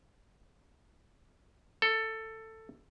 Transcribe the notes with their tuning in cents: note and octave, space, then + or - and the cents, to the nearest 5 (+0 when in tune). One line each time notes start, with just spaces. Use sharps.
A4 +15